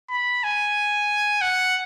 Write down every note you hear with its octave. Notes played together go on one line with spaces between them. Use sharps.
B5
G#5
F#5